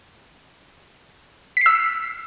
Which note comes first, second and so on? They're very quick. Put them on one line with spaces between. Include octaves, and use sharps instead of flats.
B6 C7 E6